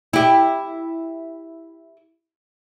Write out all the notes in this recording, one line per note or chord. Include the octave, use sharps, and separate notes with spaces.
E4 G4